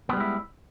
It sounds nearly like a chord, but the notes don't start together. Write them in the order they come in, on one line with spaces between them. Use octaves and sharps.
B3 G3 G#3 E4